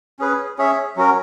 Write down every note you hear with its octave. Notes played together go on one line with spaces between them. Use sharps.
C#4 G#4 B4
C#4 G#4 C#5 E5
F#3 C#4 F#4 A#4